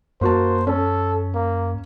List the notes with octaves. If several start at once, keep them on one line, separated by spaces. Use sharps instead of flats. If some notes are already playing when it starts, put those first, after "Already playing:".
F#2 A#3 F#4 C5 A5
C#4 A4
A#3